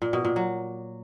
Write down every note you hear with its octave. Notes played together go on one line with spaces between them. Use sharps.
A#2
B2
A#2
F#3